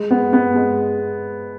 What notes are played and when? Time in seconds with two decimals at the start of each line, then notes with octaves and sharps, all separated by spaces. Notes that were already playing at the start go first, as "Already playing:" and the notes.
Already playing: G#3
0.11 B3
0.33 B3
0.55 G#3